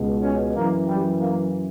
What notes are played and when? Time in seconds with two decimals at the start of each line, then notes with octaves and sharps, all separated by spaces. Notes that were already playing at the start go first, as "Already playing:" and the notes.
Already playing: C#2 B2
0.22 C#4
0.55 F#2 E3 A#3
0.87 G3
1.20 A#3